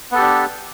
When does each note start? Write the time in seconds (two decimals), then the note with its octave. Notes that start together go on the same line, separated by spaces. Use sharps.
0.12 B3
0.15 A4
0.18 G4
0.21 D4